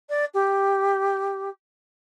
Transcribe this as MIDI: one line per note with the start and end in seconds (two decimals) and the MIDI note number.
0.09 0.25 74
0.34 1.49 67